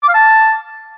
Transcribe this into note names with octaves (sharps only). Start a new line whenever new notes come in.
D6
F5
A5